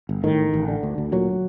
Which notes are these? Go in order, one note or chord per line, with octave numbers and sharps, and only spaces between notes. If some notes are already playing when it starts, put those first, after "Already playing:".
G1
A2 D#3
A1
A1
D3
D2
D2
A#2 F#3